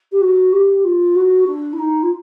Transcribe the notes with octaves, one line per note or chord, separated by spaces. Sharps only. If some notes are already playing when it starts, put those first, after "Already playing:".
G4
F#4
G4
F4
F#4
D4
E4
D#4
F4